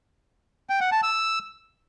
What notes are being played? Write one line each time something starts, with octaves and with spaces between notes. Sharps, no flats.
G5
F#5
A5
E6